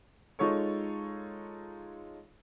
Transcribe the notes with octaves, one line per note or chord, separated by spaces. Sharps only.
G#3 D#4 F4 A4 C#5 C#6